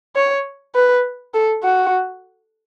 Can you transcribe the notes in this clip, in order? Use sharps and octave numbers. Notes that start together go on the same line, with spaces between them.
C#5
B4
A4
F#4